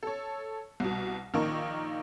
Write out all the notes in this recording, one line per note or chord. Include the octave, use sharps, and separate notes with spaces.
A4 C#5
C2 B2
A#1 D#3 A#3 A#4 D#5 C#6